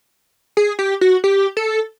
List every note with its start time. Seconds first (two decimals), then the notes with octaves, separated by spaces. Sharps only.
0.57 G#4
0.79 G4
1.01 F#4
1.24 G4
1.57 A4